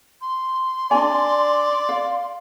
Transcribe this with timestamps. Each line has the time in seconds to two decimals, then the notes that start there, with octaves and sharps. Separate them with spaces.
0.21 C6
0.91 D4 D#4 D5 G#5
1.89 F5